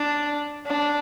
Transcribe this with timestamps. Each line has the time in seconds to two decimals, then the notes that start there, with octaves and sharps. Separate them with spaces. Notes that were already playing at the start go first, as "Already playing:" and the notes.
Already playing: D4
0.67 D4